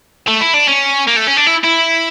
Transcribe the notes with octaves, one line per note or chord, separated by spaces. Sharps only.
A3
E4
D4
C#4
A#3
A3
C#4
D4
E4
E4